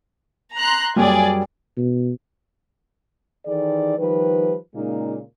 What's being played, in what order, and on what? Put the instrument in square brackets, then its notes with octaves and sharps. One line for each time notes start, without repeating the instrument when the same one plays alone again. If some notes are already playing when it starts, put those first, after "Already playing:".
[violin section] A#5 C6 F#6
[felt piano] F#2 F#3 G3 [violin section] G#4 D5
[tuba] B2
[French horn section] D#3 E3 G#4 A4 D5
D#3 F3 G3 B4
A#2 C#3 G#3 A#3 D#4